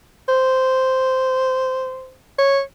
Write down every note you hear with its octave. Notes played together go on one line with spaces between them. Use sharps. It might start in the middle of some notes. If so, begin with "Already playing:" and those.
C5
C#5